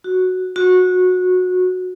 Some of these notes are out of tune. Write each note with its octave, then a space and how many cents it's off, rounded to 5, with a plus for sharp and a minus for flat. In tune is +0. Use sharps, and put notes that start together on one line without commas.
F#4 +0
F#4 -20